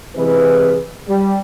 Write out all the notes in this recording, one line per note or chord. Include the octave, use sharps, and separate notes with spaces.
C3 E3 G#3 E4 G#4 B4
G3